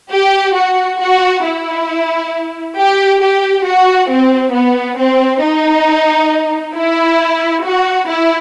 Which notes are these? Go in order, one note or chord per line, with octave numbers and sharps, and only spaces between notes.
G4
F#4
F#4
E4
G4
G4
F#4
C4
B3
C4
D#4
E4
F#4
E4